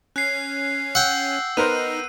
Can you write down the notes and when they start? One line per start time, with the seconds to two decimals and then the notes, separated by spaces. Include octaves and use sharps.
0.16 C#4 F#6 C7
0.95 F#5 G5 E6
1.57 B3 D#4 A#4 C5 D#7